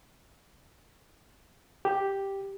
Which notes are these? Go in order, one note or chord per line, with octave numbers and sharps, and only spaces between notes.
G4